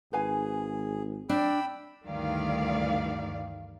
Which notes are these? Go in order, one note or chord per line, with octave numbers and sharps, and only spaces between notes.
G#1 G#4 B4 F5 G#5
D4 G5 B5 E6
D2 G2 D#3 E3 D5 F5